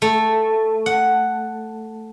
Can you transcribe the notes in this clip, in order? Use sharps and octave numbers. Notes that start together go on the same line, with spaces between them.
A3
F#5